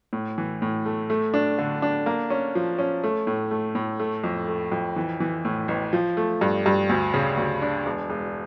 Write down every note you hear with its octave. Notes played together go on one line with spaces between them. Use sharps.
A2
E3
A2
A3
A3
D4
D3
D4
A#3
C#4
F3
C#4
A3
A2
A3
A2
A3
F2
A3
F2
E3
E3
A2
A1
F3
A3
G2
G2
D2
C#3
D2
D4
E1
E1